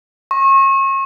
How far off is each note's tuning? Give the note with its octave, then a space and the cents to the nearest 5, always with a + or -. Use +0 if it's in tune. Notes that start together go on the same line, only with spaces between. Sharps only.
C#6 -35